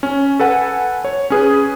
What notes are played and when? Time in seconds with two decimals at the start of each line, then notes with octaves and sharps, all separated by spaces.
0.03 C#4
0.40 A4 B4 F#5 G#5
1.05 C#5
1.30 C#4 G#4 B4